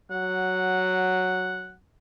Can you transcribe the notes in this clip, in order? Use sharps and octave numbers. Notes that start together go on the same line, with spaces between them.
F#3 F#5